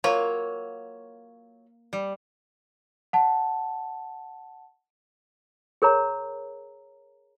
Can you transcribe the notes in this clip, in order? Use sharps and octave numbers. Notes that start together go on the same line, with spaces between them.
F#3 A#3 F4 C#5
G3
F#5 A5
G#4 A#4 C#5 A#5